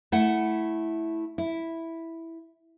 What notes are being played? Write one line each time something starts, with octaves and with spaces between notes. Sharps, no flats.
A3 E4 F#5
E4